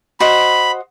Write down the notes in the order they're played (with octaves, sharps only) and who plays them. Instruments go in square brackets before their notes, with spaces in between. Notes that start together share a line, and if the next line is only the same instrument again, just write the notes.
[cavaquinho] F#4 C5 D#5 [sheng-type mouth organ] B5